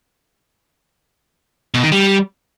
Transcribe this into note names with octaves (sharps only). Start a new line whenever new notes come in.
B2
D#3
G3